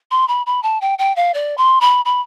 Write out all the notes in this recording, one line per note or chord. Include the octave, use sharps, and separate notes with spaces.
C6
B5
B5
A5
G5
G5
F5
D5
C6
B5
B5